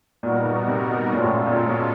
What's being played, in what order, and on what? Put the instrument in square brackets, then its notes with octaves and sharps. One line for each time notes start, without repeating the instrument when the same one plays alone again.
[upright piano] A#2 [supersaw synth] G3 B3 D#4 F#4 A#4
[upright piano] B2
C3
B2
[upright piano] A#2 [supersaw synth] G#3 C#4 F4 A4
[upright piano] A2
B2
A#2
A#2
B2